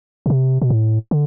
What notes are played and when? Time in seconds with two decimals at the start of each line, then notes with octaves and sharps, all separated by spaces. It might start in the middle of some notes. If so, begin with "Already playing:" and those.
0.26 B2
0.30 C3
0.62 B2
0.70 A2
1.11 D3